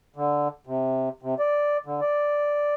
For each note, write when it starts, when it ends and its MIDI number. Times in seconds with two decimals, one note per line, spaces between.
0.16 0.48 50
0.67 1.09 48
1.22 1.35 48
1.39 1.77 74
1.86 2.01 50
2.01 2.74 74